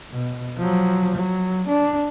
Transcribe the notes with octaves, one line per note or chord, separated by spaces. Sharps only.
B2
F3 F#3
F#3
D4